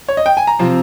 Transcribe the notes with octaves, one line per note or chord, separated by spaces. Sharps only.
C#5
D#5
G5
G#5
A#5
C3 F3 C4